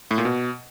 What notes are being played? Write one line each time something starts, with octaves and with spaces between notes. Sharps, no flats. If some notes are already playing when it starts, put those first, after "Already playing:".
A2
A#2
B2